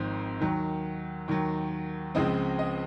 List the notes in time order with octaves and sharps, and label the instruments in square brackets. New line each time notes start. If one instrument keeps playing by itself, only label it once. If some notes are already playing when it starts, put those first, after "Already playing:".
Already playing: [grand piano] G#1 G#2 F3 C4
D#2 D#3 F#3
D#2 D#3 F#3
C#2 C#3 F3 G#3 C4 D#5
D#5